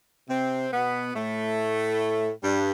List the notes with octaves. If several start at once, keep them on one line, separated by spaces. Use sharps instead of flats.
C3 C4
B2 B3
A2 A3
G2 G3